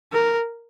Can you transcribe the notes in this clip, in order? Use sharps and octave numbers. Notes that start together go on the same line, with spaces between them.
A#4